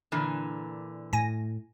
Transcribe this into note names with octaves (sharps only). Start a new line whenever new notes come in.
A#2 D3 E3
A2 G#5 A#6